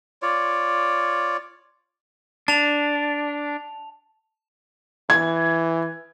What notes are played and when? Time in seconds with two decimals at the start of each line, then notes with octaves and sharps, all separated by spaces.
0.22 F4 C#5 D5
2.48 D4 A5 F7
5.10 E3 G#6